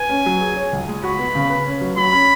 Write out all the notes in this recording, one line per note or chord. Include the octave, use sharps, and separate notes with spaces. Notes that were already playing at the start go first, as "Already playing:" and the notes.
Already playing: B4 G#5
C#4
F#3
G#4
C#5
C#2
G#3
F#4 B5
B3
C#3
B4
C#4
F#3
F#3 B5
C#4